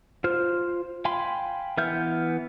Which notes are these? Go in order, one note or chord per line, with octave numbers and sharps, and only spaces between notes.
F4 C5 F6
F5 G5 G#5 B5 C6
E3 B3 E5 F6 G6